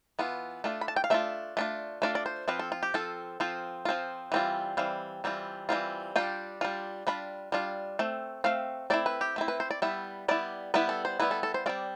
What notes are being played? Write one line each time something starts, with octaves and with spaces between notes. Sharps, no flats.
E3 B3 F4
A3 D4 F4
B5
A5
G5
F5
A3 D4 F4 E5
A3 D4 F4
A3 D4 F4 D5
D5
C5
F3 C4 F4 B4
A4
F4
G4
F3 C4 F4 A4
F3 C4 F4
F3 C4 F4
E3 G3 C4 F4
E3 G3 C4 F5
E3 G3 C4 F4
E3 G3 C4 F4
G3 D4 F4 G5
G3 D4 F4
G3 D4 F4 B5
G3 D4 F4
A3 C4
A3 C4 F5
A3 C4 E4 D5
B4
G4
A3 C4 E4
B4
C5
D5
G3 B3 E4 E5
G3 B3 E4 D5
G3 B3 E4 B4
A4
C5
G3 B3 E4 B4
A4
A4
C5
G3 C4 F4 D5